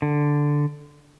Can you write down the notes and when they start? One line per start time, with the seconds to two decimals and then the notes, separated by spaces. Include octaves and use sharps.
0.02 D3